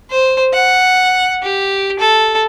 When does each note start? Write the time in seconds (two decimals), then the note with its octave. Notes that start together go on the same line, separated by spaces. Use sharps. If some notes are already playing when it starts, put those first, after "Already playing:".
0.10 C5
0.53 F#5
1.43 G4
1.99 A4